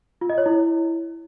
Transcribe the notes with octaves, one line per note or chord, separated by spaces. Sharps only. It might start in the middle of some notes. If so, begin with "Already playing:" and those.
F4
D#5
C#5
E4